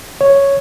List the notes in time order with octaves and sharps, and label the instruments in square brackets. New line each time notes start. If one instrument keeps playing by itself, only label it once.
[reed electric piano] C#5